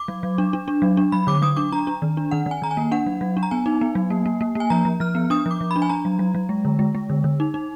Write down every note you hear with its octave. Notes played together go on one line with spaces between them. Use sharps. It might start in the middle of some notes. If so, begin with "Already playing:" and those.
Already playing: D6
F#3
F#3
D4
D4
D4
F#3
D4
F#3 B5
D3 D6
F#3 D#6
D4 D6
D4 A#5
D4
D#3
D4
D#3 F#5
D#3
G#5
D#3 A#5
G#5
A#3
D4 F#5
F#3
F#3
D4
A#5
B3 G#5
D#4
B3
F#3
A#3
A#3
A#3
A#3 G#5
F3 A#5
F3
F3 F6
B3
D4 D#6
F3 D6
F3
D4 B5
G#5
D4 A#5
F#3
F#3
F#3
G#3
D3
G#3
G#3
D3
D3
D#4
D#4